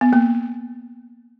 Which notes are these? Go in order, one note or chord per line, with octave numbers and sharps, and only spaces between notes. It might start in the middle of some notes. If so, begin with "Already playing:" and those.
B3
A#3